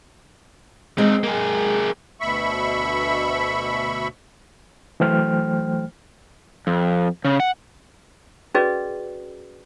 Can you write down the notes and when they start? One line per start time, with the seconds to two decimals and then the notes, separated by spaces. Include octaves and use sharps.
0.98 G#3 C4 D#4
1.24 A#3 G#4
2.21 D2 B2 E5 B5 C#6
5.00 E3 F#3 A3 C5 G5 F6
6.67 F2
7.25 C#3
7.40 F#5
8.55 C#4 F#4 G#4 B4 D5 D#5